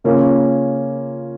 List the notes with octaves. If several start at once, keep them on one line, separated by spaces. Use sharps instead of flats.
C#3 A#3 C#4 F4